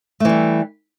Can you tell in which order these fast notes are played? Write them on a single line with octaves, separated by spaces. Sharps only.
A3 E3 G3